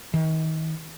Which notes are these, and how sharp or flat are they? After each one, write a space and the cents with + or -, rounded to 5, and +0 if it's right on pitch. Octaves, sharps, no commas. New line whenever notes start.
D#3 +35